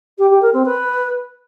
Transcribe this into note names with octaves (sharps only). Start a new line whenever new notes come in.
G4
G4
A#4
C4
B4